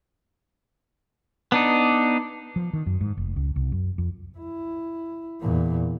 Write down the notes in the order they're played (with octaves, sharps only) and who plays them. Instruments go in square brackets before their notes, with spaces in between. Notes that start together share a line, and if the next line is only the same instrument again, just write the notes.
[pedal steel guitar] B3 D4 D#4
[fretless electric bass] F3
D#3
F#2
G#2
F1
C#2
C2
F#2
F2
[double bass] E4
E2 A#2